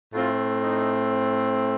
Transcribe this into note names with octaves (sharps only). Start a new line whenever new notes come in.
A2 A3 C4 F4
D#4